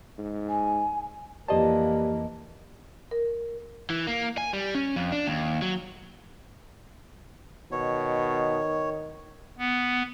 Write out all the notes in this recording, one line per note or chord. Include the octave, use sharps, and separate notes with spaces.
G#2
G#5
F2 E3 A#3 G4 B4 D5 D#5 A5
A#4
E3
A#3
G#5
G3
C#4
F2
D4
D#2
F#3
B2 D#3 C#5
B3